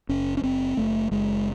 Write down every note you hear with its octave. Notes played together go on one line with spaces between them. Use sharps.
F#1 C#4
C#4
F#1 C4
F#1 A3
F#1 G#3